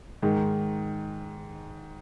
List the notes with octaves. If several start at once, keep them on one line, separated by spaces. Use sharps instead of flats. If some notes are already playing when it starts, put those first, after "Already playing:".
G#2 D#3 G#3